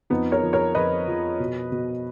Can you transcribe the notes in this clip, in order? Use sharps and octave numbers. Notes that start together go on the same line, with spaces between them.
F2 B3 D#4
A#4 C#5
F3
A#4 C#5
F2 B4 D#5
F3
B2
B2